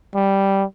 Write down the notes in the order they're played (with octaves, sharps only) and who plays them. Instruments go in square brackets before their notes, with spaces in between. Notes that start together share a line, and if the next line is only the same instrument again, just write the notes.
[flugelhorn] G3